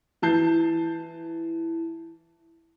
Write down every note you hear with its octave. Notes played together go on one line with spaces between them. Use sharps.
E3 A5 G6 C7